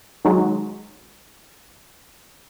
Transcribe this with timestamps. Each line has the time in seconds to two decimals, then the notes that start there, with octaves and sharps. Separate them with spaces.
0.25 D#3 F#3 G#3